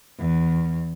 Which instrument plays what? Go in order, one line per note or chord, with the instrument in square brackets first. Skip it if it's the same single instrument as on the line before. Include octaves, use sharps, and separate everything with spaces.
[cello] E2